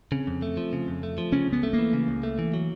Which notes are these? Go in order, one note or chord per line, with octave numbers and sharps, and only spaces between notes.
C#3 C4
F2
A3
F3
C#3
F2
A3
F3
C#3 C#4
C#2 B3
A3
A#3
E3
C#3
C#2
A3
E3
F#3